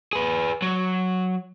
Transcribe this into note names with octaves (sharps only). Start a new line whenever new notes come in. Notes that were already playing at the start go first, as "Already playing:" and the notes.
G#4 B4
F#3